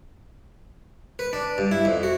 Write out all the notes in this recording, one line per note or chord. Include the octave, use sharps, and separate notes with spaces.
B4
D4
G2
E4
F2
F#4